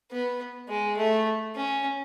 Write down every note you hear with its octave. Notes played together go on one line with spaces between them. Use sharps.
B3
G#3
A3
C#4